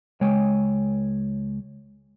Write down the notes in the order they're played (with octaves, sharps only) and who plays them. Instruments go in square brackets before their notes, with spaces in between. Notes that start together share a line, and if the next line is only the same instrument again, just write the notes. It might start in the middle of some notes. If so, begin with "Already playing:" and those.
[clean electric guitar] C#2 G#3 C#5 G5 G#5